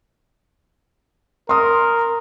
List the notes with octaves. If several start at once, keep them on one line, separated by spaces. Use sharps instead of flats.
A#4 C6 D#6